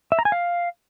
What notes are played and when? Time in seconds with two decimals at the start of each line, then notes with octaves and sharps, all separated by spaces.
0.12 E5
0.19 A#5
0.25 G#5
0.32 F5